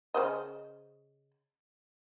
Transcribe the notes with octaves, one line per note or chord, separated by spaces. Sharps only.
C#3 C5 D#5